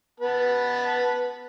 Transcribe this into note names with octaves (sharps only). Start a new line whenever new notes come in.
B3 B4 A5